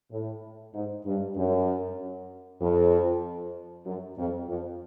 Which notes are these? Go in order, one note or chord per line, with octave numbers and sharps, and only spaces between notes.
A2
G#2
G2
F#2
F2
F#2
F2
F2